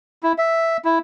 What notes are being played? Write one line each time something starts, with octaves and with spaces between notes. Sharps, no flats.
E4
E5
E4